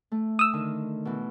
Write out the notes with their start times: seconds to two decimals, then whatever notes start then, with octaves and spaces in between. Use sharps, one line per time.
0.12 A3
0.39 D#6 E6
0.53 D3 D#3
1.05 B2 E3